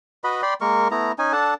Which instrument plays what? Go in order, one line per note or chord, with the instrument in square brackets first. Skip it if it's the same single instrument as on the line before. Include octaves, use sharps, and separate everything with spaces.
[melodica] F#4 B4 D#5 B5
D5 G5 B5 C6
G#3 A#3 A#4 C#6
A3 B3 E4 A#5
C#4 D#4 G#5
D4 A4 F#5 A5